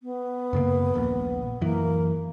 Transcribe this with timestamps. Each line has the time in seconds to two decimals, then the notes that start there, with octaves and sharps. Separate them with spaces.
0.01 B3
0.53 F#2 C#3 A#3
0.94 D#1 A#1
1.61 F#2 E3 A#3